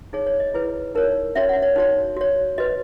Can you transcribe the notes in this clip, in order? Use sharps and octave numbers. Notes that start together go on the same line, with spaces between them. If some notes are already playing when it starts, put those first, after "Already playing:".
D#4 G#4 C#5
C#5
D#5
E4 G#4 B4
D#4 A#4 C#5
C#4 F#4 C#5 E5
F#5
C#5
D#4 F#4 C#5
F#4 C#5
F#4 B4 D#5